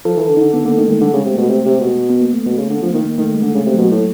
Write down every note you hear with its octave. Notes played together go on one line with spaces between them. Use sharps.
F3 A4
E3
A4
D3
D#4
D3
D3 B3
D3 A#3
D#3 A3
D#3 G#3
D3 G3
C#3
G#3
C3
B2 A3
C3
C3
B2
B3
A#3
A3
B2 A3
C#3
D3
A3
F3
D#3 A#3
A#3
D#3 A3
G#3
D3 A3
C#3
A3
C3
F#3
B2
A2